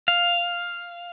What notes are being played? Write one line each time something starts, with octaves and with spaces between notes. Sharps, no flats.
F5